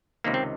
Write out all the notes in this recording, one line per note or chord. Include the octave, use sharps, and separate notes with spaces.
C#2 C3 D#3 A#3
C4